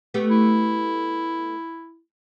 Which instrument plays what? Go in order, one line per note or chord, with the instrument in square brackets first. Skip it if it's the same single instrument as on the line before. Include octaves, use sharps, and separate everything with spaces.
[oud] A3 B3 G4
[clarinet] E4